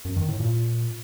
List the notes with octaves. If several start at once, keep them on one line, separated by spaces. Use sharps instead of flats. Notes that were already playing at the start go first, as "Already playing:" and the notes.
F#2
D#3
A2
A#2